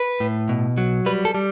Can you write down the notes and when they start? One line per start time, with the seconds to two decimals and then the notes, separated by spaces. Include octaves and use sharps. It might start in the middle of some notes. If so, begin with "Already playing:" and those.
Already playing: B4
0.20 A2
0.49 B2
0.78 F#3
1.06 G3 B4
1.25 A4
1.35 G3